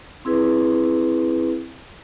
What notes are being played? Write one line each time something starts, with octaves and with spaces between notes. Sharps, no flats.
C4 E4 G#4 B4